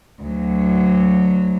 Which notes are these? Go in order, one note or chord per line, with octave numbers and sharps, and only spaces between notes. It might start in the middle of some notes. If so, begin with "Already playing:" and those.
D2 F#3